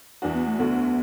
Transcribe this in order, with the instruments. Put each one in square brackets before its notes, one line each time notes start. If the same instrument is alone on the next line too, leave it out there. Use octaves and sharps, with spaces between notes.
[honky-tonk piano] E2 E3 D4 F#4
[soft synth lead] B3
A3
[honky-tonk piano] D2 D3 A3 D4 F#4 [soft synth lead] B3